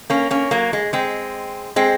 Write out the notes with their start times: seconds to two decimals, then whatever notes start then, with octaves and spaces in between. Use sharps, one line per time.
0.10 A#3 C#4
0.31 A#3 C#4
0.51 F#3 A#3
0.73 G#3
0.93 G#3 C4
1.76 G#3 C4